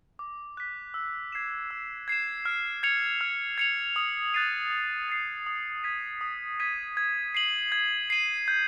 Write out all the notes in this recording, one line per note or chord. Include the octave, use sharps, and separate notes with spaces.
D6
F#6 B6
E6
G#6 C7 E7
E6
G#6 C7 E7
F6
G#6 C#7 F7
F6
G#6 C#7 F7
D#6
F#6 A6 C7 D#7
D#6
F#6 A6 C7 D#7
D#6
G#6 B6 D#7
D#6
G#6 B6 D#7
G#6
C7 D#7 F#7
G#6
C7 D#7 F#7
G6